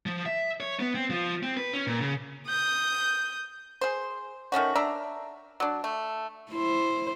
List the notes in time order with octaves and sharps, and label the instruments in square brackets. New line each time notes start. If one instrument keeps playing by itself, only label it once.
[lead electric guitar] F3
E5
C#5
B3
C4
F3
C4
B4
C#4
A#2
C#3
[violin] D#6 G6
[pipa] G#4 C5
D#3 A3 C#4 F#4
D4 E5 A#5
F#3 D4
A3
[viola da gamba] E4 C5